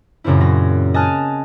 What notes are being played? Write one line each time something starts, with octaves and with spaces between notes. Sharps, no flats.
F#2 A#2 C#3 C4 E4
F#3 A#6
D#5 G#5 A5 D#6 F6 F#6